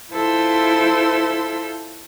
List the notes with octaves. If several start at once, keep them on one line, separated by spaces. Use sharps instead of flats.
E4 F4 A4 C5 C6 E6